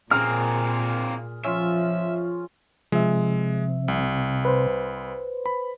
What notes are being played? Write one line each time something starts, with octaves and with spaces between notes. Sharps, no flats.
A#2 A#3 C4 G#4 F6
F3 C#4 F4 E5
C3 F3 G#3 E5
C2
B4 C5
B5